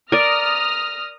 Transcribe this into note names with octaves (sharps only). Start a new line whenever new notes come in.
A#4 D5 D#6 F6 A#6